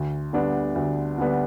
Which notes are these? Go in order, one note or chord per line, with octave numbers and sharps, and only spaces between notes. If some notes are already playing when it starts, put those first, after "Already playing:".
Already playing: D2
D3 G3 B3 D4
D2
D3 G3 B3 D4